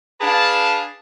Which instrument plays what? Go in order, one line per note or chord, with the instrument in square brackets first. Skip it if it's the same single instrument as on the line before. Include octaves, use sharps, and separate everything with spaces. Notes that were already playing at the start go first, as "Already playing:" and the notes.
[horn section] D4 G#4 B4 F5 A5